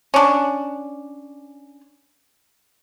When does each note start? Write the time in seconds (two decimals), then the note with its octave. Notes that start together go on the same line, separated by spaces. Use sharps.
0.14 C#4 D4